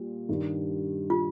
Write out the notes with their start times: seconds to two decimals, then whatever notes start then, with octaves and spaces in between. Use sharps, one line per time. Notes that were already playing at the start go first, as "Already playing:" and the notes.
Already playing: A#2 G3
0.29 G2 D#3 G3
1.10 F4